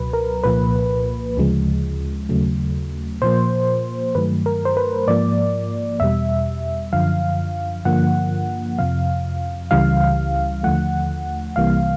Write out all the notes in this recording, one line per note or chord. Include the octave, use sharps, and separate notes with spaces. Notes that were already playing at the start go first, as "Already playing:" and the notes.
Already playing: C#2 B2 F#3 B4
A#4
C2 A#2 F3 A#3 B4
D2 C#3 F3 G#3
D#2 C#3 F#3 A3
A#2 F3 A#3 C5
G2 D#3 F#3 A3 B4
A#4
C5
B4
G#2 F3 A#3 D5
E2 B2 G3 E5
F#2 D3 F3 F5
G2 D3 F3 A#3 F#5
F2 C3 F3 F5
C#2 C#3 E3 G3 F5
D#2 D3 F3 A3 F#5
C2 C3 E3 G3 A#3 F5